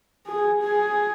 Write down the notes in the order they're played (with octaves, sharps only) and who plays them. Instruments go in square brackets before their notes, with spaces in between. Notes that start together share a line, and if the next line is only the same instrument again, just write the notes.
[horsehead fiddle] G#4
G#4